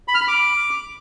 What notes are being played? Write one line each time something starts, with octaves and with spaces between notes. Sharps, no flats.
B5
F6
B5
D6